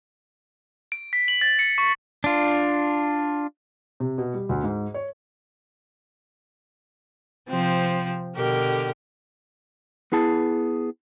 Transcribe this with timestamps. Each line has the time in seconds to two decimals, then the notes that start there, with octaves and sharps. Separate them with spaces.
0.92 D7
1.13 B6
1.28 F#7
1.41 A6
1.59 C#7
1.78 C#6
2.24 D4 F4
4.00 C3
4.18 B2
4.34 G3
4.49 D2
4.64 G#2
4.94 C#5
7.49 C3 F3 C4
8.36 B2 D3 G4 A#4
10.12 B3 E4 G#4 A5